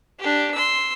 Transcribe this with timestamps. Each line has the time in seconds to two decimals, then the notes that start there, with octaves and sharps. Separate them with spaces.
0.19 D4 G4
0.54 C6 E6